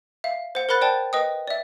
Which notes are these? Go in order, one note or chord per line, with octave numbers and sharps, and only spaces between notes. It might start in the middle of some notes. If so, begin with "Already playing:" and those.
E5 F5
C5 F#5
A#4 C5 F#5 B5 F#6 A6
C5 D5 G5 A5
B4 D#5 G5 D#6
D5 E5